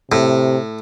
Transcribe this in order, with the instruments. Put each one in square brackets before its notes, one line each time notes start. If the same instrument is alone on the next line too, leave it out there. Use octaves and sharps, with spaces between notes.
[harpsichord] A2 [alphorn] C3